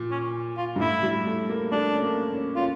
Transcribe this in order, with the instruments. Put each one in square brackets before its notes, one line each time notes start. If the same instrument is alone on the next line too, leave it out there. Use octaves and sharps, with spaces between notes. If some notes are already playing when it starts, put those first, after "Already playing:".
Already playing: [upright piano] A#2
[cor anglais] C#4
F4
[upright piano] G2
[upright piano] A2 [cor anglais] E4
[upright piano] G3
A3
A#3
[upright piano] A3 [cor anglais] D4
[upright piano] C#4
A#3
C#4
[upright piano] C#4 [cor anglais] F4